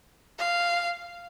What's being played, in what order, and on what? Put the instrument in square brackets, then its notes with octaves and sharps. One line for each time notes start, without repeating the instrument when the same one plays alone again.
[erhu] F5